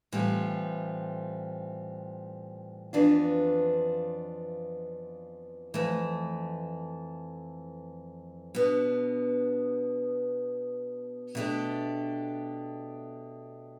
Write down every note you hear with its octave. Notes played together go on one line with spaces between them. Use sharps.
A2 E3 G3 C4 F4
F2 E3 B3 D4 F4
F2 E3 A3
B2 B3 D4
B2 A3 D4 G4